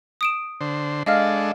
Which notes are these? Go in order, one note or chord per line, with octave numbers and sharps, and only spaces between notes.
D#6 D7 E7
D3 C5
G#3 D4 A4 D#5 F5 F6